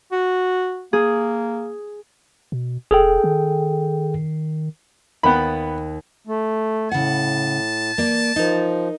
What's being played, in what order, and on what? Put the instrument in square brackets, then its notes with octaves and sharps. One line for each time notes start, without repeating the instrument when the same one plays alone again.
[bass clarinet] F#4
[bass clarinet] A#3 [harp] G#4
[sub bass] B2
[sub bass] E1 [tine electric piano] G#4 A4 G5
[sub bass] D#3
[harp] D#2 G5 A6 [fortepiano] B3 B5
[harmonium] A3
[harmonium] A2 [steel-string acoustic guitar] C#3 F#5 [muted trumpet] A5
[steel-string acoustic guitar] A#3 D5
[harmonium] F3 [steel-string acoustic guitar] D#4 A#4